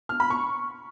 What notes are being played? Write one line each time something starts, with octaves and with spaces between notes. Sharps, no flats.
F6
B5
C#6